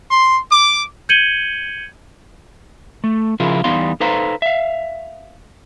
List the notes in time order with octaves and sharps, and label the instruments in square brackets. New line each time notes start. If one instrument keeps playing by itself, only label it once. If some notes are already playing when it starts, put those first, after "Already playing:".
[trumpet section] C6
D6
[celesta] G6 G#6 C#7 D#7 F#7 G7
[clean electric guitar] A3
C#3 F3 E4 F4 G#4 A#4
E2 G3 B3 D#4 F5 C6
D#4 A4 B4 C5 F5 A#5
E5 F5